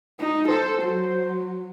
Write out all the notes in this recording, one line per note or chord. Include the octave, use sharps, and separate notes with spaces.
D#4
A4 C5
F#3